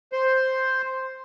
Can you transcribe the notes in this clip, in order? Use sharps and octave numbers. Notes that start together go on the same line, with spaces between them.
C5